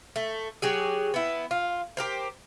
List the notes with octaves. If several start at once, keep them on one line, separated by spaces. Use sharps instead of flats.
A3
F#3 G4 G#4
B3 E4
F4
G4 A#4 C5